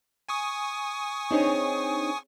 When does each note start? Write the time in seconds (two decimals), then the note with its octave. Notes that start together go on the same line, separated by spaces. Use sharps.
0.29 G#5 C#6 D#6
1.31 C4 D4 D#4 G#4 C#5